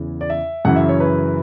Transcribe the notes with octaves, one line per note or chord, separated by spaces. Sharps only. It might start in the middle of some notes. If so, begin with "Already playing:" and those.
Already playing: E2 C#3 E3
D5
E5
F#2 C#3 E3 F#5
E5
C#5
B4